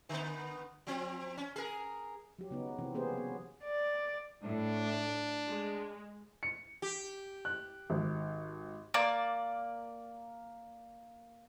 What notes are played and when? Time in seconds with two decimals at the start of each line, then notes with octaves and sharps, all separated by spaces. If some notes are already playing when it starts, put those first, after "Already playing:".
0.09 D3 B3
0.87 F3 C4
1.37 C#4
1.56 G#4 A#4
2.39 F#3 G4
2.51 C#3 B3 D#4
2.78 C3 E3 C4
2.94 A#3 B3 C#4 G4 G#4 C5
3.13 F#3 B3
3.64 D5
4.43 A2 D4
5.47 G#3
6.43 C#7
6.82 G4
7.45 F#6
7.90 G#1
8.94 A#3 D5